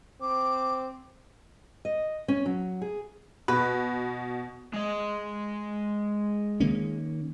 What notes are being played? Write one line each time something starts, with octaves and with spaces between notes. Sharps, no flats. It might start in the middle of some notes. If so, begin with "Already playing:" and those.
C4 D6
D#5
C#4
F#3
G#4
B2 B4
G#3 D#5
D#3 A#3 C#4